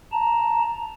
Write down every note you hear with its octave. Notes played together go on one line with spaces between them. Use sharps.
A5 A#5